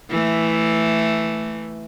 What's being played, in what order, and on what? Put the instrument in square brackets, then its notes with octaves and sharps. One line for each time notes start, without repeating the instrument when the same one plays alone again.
[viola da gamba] E3 A3